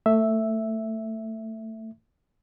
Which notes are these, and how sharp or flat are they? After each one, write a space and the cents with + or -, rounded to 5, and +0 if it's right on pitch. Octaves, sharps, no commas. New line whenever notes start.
A3 +20 E5 +0